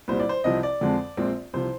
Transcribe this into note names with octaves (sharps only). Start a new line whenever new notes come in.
C2 A#2 G3 C5
D5
C5
C2 C3 F3 C4 D#5
D5
F2 D3 G#3 C4
A#1 A#2 G#3 C4
C2 C3 F3 C5